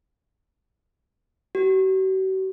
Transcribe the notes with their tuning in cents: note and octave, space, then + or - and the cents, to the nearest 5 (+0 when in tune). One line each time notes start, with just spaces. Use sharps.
F#4 +45